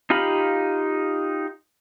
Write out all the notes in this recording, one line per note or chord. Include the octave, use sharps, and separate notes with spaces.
D#4 F4 G4 F5 B5